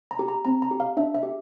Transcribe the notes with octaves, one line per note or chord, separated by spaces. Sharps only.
A#5
G4
A#5
C4 A#5
A#5
G4
F5
D4 E5
E5
G4